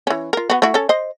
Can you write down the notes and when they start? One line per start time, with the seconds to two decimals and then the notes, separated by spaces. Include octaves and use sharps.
0.07 E3 C#4
0.33 F4 A#4
0.50 B3 F#4
0.62 A3 E4 F#4
0.74 C#4 A4
0.89 C5 D#5